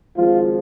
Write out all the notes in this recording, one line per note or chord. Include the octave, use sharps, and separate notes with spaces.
G#1 G#2 F3 F4